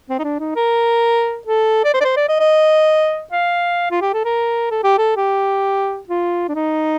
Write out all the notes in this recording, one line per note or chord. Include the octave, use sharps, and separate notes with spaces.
C4
D#4
D4
D#4
A#4
A4
D5
C5
D5
C5
D5
D#5
D#5
F5
F4
G4
A4
A#4
A4
G4
A4
G4
F4
D4
D#4